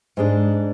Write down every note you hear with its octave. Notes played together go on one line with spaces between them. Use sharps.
G#2 G#3 D4